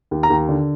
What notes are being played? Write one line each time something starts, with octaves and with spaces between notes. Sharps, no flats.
D#2
A#5
D#2
D3